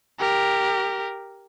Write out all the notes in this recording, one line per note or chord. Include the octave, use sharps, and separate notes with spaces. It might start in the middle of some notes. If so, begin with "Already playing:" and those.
G4 A#4